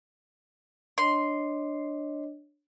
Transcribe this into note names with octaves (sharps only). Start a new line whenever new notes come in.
D4 C#5 D#5 C6